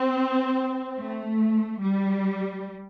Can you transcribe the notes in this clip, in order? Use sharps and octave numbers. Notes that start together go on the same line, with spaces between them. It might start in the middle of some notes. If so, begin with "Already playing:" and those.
Already playing: C4
A3
G3